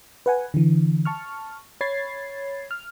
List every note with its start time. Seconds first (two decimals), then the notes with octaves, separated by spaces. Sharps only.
0.26 B4 F#5 G#5
0.54 D3 E3
1.05 A5 C#6 F6
1.81 C#5 B5 G#6 A6 C7
2.71 F6